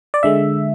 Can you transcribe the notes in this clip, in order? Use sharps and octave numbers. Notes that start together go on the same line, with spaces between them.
D5
D3 G#3 E5